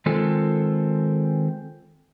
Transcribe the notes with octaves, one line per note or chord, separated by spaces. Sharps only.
D#3 G#3 C4 F4 A4